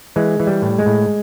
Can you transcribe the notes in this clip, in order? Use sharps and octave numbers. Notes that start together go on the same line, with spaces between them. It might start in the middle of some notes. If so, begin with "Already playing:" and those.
E3 G#3
E3
G3
A2
G#3
A2